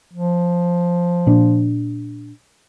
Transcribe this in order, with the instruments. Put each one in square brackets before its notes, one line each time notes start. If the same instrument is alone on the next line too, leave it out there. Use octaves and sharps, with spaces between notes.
[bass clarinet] F3
[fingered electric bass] A#2 D4